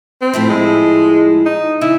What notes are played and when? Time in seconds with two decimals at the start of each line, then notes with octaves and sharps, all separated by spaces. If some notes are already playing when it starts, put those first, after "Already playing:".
0.21 C4
0.33 A2 F3 E4
0.50 G#3
1.46 D#4
1.81 C#3 E4